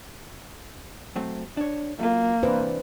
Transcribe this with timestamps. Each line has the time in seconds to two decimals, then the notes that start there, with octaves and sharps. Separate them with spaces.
1.16 F#3 A3 C4
1.57 D4 C#5
2.00 F#2 A#3 F4
2.43 C3 E3 D4 B4 C5